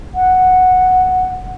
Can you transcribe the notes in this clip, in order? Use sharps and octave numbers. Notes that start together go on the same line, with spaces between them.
F#5